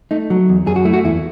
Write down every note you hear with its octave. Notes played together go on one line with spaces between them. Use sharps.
A3 D#4
F#3
E2
F#2 G#4
F#4
A3 E4
F#4
E2 E4